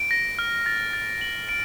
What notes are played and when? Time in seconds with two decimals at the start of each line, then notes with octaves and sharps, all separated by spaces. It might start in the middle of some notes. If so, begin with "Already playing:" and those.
Already playing: D7
0.11 A#6
0.39 F6
0.66 A6
0.93 A6
1.21 F#7
1.49 D7